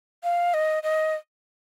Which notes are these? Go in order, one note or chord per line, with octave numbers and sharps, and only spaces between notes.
F5
D#5
D#5